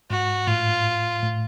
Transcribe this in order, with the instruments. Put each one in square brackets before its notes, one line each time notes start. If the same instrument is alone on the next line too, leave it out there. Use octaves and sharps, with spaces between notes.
[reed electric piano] G#2 [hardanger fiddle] F#4
[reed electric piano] A2 [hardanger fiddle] F4
[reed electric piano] A2